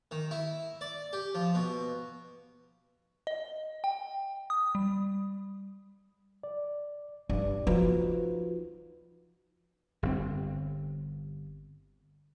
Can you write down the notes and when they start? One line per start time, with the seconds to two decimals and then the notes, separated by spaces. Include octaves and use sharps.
0.11 D#3
0.31 E4
0.81 D5
1.13 G4
1.35 F3
1.55 B2
3.27 D#5
3.84 G5
4.50 D#6
4.75 G3
6.43 D5
7.30 G2 D4 D5
7.67 F3 D#4 F4 F#4 B4
10.03 G1 G2 C3 C4